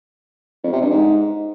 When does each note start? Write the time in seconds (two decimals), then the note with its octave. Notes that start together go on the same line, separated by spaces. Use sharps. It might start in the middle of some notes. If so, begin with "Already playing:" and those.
0.64 F2
0.73 C3
0.81 G2
0.90 G#2